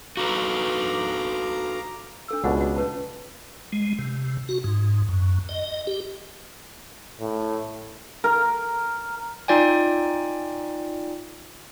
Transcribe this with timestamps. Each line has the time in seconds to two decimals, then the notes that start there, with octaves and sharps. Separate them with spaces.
0.17 F#4 A4 B4 F5 A#5 D6
2.28 D4 A4 E6
2.44 C#2 B2 D4 F#5
2.61 F#4
2.76 C#4 B4 A5
3.72 G#3
3.99 C3
4.49 F#4
4.64 G#2
5.09 F#2
5.49 D#5
5.87 G4
7.20 A2
8.24 A#4
9.48 D#4 F4 D5 G5 G#5